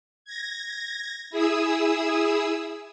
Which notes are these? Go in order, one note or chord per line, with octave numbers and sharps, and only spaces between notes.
G#6 A#6
E4 G#4 D#6 E6